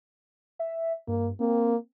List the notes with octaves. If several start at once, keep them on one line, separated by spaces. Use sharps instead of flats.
E5
G2 A#3
A#3 C4